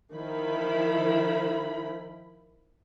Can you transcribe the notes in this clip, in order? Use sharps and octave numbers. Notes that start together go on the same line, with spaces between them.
D#3 F3 E4 B5